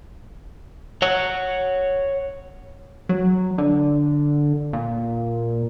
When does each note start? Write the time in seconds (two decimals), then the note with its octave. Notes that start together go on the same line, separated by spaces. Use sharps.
1.02 C#5 F#5
3.09 F#3
3.58 D3
4.73 A#2